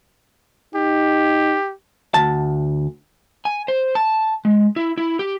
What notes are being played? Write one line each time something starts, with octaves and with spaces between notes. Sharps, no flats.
D#4 G4
D2 A5
G#5
C5
A5
G#3
E4
E4
G4